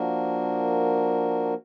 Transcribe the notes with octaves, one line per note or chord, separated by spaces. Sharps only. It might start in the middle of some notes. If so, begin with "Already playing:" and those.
Already playing: F3 A#3 D4 F#4 A#4